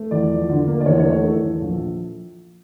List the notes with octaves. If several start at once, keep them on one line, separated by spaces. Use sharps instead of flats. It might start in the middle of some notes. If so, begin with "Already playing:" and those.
Already playing: A3
E2 D5
F3
D3
A#3
D5
E2 C#5
C#5
A3
C#5
E3 A4
E2
A#1